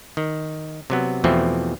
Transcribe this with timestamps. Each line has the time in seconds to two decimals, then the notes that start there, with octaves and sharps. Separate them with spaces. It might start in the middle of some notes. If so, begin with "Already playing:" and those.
0.17 D#3
0.90 C3 F#3 B3
1.24 E2 B2 E3 F3 A3 C4